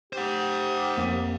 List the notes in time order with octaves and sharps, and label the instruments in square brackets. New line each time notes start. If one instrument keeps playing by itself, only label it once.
[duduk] G4 [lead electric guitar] C5 F#5
[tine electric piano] F2 A#3